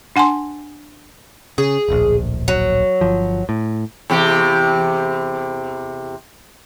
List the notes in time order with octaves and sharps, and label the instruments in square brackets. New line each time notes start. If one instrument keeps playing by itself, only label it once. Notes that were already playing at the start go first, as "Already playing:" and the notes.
[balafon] D4 F#5 G#5 A5 C6
[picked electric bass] C#3 [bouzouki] G#4
[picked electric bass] D1 A#1
[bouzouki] F#3
[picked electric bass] G1 F3
A2
[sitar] E2 C3 G4